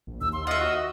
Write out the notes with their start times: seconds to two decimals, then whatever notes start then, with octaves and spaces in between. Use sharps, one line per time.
0.07 A#1
0.21 D#2 E6
0.33 C6
0.47 F4 D#5 E5 F#5
0.60 F#4